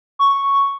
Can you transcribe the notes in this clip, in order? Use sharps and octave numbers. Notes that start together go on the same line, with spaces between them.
C#6